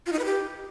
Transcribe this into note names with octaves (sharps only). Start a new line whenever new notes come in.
F4
D#4
B4
G4